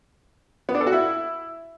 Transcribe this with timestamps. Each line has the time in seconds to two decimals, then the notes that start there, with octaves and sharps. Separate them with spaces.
0.69 B3
0.75 D4
0.81 A4
0.87 F#4
0.93 E4